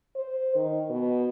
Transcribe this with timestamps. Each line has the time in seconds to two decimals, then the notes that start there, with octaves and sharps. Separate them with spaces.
0.15 C5
0.55 D#3
0.90 B2